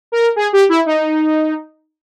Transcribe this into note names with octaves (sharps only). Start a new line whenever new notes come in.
A#4
G#4
G4
E4
D#4